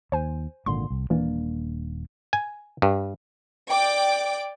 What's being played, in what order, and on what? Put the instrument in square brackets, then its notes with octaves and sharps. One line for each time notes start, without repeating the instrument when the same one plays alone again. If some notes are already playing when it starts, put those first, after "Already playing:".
[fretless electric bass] D#2 [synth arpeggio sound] C5 G#5
[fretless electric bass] G#1 A#2 D3 [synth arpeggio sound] C6
[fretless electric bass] C2
[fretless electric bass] D#1 A#3 D4 [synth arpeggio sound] E3
[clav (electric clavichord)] G#5
G2
[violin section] D5 G5 D6